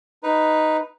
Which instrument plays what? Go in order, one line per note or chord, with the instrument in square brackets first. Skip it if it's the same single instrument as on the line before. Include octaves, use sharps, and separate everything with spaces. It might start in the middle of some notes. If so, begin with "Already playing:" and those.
[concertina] D#4 B4